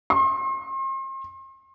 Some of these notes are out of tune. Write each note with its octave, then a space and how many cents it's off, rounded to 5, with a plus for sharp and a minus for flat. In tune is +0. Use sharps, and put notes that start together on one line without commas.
C6 +40